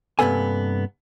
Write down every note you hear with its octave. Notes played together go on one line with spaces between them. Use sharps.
G2 C3 A#3 B3 A4 G#5